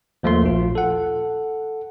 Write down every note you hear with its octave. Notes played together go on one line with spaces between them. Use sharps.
D#2 F3 A3 A#3 C6
A#1 F4
A4 F#5